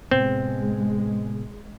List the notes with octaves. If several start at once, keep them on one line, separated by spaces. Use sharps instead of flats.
A2 C3 G#3 B3 C4